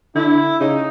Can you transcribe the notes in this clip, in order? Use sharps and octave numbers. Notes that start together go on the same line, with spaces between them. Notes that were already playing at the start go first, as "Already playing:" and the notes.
D3 E4
C#3 D#4